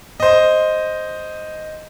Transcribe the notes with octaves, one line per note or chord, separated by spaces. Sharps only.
C5 D#5